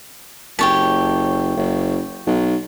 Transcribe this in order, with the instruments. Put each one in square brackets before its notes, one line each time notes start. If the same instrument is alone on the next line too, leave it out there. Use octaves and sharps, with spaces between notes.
[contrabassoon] F#1 [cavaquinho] G4 C#5 A5
[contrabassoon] F#1
B1